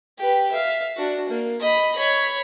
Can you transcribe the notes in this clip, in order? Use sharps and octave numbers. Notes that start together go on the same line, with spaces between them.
G4 B4
E5 F5
D4 F#4
A#3
D#5 B5
C#5 B5